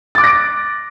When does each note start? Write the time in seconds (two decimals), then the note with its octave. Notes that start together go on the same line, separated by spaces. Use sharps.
0.15 A6
0.18 D6
0.21 F#6
0.24 A#6
0.27 D7